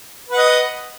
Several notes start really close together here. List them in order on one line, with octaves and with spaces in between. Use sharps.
B4 F#5 D#5